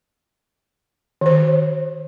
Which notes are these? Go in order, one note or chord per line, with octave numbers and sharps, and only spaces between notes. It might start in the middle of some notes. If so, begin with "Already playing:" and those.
D#3 C5